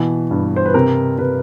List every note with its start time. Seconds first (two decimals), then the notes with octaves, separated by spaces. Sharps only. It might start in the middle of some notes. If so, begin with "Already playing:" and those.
Already playing: B2 E3
0.31 G2
0.56 C5
0.66 B4
0.74 C3 A#4
1.18 C3 B4